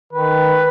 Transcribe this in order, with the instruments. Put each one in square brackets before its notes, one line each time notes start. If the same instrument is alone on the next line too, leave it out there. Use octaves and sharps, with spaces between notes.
[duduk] D#3 [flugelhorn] B4